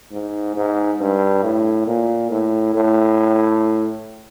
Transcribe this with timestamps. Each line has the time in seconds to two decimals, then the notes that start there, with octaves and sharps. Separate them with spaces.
0.13 G#2
0.56 G#2
1.01 G2
1.44 A2
1.87 A#2
2.31 A2
2.74 A2